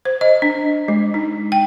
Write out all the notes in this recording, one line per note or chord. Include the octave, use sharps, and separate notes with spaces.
C5
D#5
D4
G#3
D#4
G5